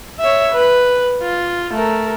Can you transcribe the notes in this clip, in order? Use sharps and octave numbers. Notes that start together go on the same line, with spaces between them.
C#5 E5
B4
F4
A3 A#4